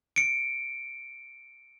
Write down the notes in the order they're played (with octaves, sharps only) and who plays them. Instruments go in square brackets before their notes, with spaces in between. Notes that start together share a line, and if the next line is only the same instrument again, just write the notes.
[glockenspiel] C#7 D7